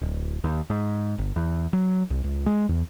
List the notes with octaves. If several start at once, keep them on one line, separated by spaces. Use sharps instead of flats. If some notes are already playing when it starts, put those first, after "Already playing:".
D1
D#2
G#2
G1
E2
F#3
C2
C#2
G#3
E2